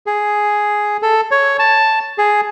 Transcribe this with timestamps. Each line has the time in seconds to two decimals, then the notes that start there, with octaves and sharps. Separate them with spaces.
0.07 G#4
1.02 A4
1.31 C#5
1.59 A5
2.18 G#4